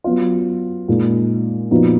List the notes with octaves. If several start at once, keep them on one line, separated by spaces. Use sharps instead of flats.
F#3 B3 F4
A#2 G#3 D#4
A#2 F3 B3 D#4 F#4